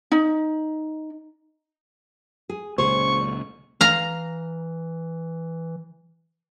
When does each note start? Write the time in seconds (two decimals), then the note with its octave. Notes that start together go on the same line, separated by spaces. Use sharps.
0.12 D#4
2.49 G#4
2.78 C#2 A#2 C#4 G#4 C5 C#6
3.81 E3 F5 A#5